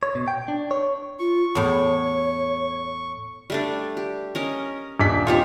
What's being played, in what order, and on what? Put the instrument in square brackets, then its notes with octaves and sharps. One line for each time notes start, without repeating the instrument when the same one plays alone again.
[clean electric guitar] C#5
B2
G5
D4
C#5
[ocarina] F4 [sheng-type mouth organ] C#6
[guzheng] E2 A2 [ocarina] C#5
[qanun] G3 A3 D4
G4
C#4 A#4 D#5
[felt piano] D#1 D4 B6
[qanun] C4 D#4 C#5 [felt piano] F4 G4